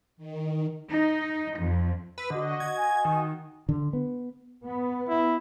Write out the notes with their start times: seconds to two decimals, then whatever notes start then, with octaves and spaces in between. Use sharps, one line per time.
0.17 D#3
0.89 D#4
1.59 F2
2.18 B4 E6
2.30 D3 F#4 D#5
2.60 G#6
2.77 G#5
3.05 D#3
3.69 D3
3.93 B3
4.64 B3
5.08 E4